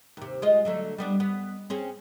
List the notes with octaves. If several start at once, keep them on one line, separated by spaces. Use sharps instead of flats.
D#2 C3
G#3 F4 D#5
D3 F#3 A3
G3 B3 D4
B3
C4 C#4 G#4